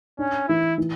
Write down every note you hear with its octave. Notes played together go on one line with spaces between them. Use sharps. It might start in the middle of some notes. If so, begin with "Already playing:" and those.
C#4 D4
E3 E4
E3